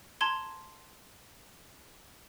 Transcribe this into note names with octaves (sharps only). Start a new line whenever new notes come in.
A5 A#5 C6 G#6 G7